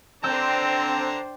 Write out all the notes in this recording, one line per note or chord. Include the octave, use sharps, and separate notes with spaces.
D3 C4 D4 C5 G5 A5 A#5 E6